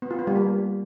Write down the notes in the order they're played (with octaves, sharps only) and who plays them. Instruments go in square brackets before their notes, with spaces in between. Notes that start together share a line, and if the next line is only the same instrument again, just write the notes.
[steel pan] B3
F4
B3
G3
A#3